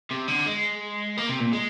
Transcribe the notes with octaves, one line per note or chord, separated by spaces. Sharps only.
C3
D3
G#3
A#3
C3
A#2
G#3